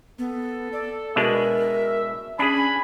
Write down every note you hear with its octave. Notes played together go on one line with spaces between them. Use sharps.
B3 A4
D5
B2 G#3 D4 A#4 E5
C#4 D4 G#4 G#5 B5